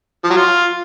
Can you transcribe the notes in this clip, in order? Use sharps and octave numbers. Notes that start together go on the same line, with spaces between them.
F3
F#3
F4